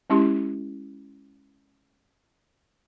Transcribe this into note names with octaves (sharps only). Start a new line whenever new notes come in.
G#3 C#4 E4 G4 C6